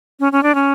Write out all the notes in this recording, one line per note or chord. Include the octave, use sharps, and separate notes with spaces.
C#4
C#4
D4
C#4